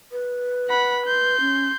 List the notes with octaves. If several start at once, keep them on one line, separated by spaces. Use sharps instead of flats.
B4
F#5 B5
C6 G6
C#4